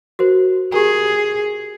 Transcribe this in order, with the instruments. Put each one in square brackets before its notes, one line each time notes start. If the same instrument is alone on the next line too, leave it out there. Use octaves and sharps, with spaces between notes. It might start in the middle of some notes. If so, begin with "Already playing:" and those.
[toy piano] F#4 A#4 C5
[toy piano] G4 A#4 A#5 [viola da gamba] G#4